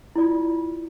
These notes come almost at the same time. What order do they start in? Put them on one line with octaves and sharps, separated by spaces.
E4 D5 F4